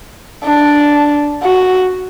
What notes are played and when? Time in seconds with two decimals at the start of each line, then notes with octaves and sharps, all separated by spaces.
0.44 D4
1.43 F#4